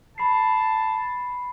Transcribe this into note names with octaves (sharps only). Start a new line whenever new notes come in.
A5 B5 C7